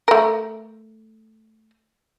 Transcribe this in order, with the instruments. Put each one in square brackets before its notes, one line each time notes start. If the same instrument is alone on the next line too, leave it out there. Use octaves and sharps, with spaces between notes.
[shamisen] A3 A#4